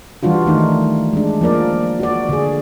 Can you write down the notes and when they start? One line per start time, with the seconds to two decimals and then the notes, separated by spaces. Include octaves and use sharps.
0.23 E3 G3 D4 F4 F#4
0.46 D#3 A3 D#4
1.13 G#3 D4
1.41 F3 A#3 A#4 D5
2.00 F#4 D5
2.29 D3 G#4